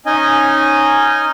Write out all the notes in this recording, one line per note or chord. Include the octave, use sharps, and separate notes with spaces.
C#4 D#4 D#5 G#5